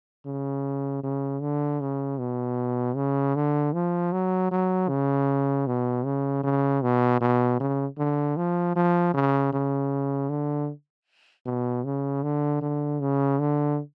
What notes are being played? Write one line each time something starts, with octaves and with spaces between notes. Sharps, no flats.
C#3
C#3
D3
C#3
B2
C#3
D3
F3
F#3
F#3
C#3
B2
C#3
C#3
B2
B2
C#3
D3
F3
F3
C#3
C#3
D3
B2
C#3
D3
D3
C#3
D3